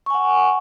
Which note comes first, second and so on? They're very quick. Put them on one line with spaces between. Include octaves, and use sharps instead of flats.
C#6 G#5 F#5